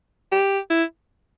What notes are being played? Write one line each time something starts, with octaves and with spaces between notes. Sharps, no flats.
G4
E4